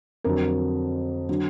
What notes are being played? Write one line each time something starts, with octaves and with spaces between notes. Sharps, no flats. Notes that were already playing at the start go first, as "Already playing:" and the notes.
F2 D3 F#3 A#4
D3 F#3